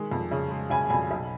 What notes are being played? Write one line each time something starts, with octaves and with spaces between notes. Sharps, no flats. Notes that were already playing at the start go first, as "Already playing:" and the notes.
Already playing: D#3 G#3
F2
C#3
G#3
C#3 G#5 B5
F2 G#5 B5
B1